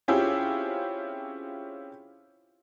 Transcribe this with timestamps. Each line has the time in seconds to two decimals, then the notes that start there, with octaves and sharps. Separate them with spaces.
0.08 C4 C#4 E4 F4 G4 G#4